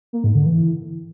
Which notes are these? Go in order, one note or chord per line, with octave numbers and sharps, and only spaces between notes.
A#3
G#2
D3
E3